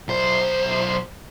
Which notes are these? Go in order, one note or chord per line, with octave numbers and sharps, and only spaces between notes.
B1 C5